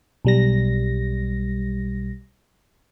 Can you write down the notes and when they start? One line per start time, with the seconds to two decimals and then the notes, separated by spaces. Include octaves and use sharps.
0.25 B1 G3 A#6